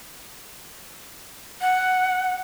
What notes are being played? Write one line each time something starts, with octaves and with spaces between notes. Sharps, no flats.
F#5